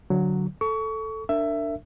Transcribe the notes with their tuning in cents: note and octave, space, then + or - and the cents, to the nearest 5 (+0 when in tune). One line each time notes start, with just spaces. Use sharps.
D3 +0 F#3 +0
A4 +0 C#6 +25
D4 +10 A#4 -35 E5 +15